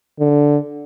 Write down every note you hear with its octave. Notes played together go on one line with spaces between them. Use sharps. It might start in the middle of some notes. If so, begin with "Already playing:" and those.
D3